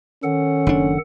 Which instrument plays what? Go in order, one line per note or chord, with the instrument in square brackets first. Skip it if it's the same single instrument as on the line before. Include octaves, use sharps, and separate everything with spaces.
[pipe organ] D#3 A4 F#5 [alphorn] C#4
[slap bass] F#1 D4